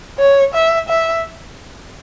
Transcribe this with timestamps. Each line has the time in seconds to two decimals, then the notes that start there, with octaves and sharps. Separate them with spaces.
0.18 C#5
0.54 E5
0.88 E5